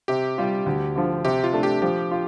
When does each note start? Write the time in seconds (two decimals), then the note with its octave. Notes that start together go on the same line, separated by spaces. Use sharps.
0.08 C3 G4
0.38 G3 F4
0.66 D2
0.96 D3 F3
1.25 C3 G4
1.44 F4
1.53 A3 D4
1.63 G4
1.82 F3 G4
2.11 F4